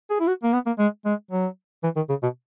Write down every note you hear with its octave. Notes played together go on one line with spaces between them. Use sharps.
G#4
E4
F#4
A#3
B3
A#3
G#3
G#3
F#3
E3
D#3
C#3
B2